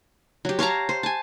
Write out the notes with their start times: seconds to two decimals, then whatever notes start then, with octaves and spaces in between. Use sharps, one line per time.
0.45 F#3 G4
0.59 C#5 F5 A5 A#5
0.89 C5
1.03 G#5 A5